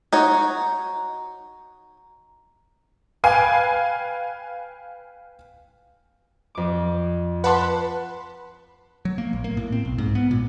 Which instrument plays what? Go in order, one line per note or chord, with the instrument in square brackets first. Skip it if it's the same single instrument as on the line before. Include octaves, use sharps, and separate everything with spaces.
[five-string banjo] D#4 F#4 C#5
[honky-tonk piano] B4 F5 G5 G#5
[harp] F2 D6
[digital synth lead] B4 [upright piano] F#5 A5 C6
[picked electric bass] F#3
A#3
A#1
A#3
A2
C4
B1
G#2
B3
A#2